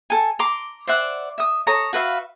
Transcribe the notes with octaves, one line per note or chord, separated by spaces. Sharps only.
A4 G#5
A#5 C6 D6
C5 D5 E5 F#5
E5 D#6
A4 C#5 A#5 D#6
F#4 B4 E5 F5